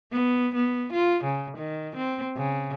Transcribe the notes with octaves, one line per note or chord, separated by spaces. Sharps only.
B3
B3
F4
C#3
D#3
C4
C#3